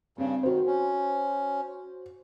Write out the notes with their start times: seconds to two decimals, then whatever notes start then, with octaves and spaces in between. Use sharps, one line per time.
0.18 G2 C#3 C4
0.43 D#3 F#4 C5
0.66 C#4